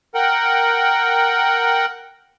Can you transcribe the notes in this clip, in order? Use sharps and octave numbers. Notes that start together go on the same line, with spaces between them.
A#4 F#5 G5